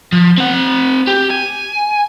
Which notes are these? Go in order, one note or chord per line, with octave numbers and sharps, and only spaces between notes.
F3
C4 F#5
G4
G#5